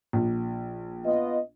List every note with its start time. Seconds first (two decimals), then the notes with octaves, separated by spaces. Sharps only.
0.13 A#1
1.04 B3 F4 D#5